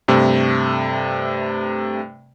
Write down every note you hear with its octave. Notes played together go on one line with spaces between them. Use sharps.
G2 C3 A3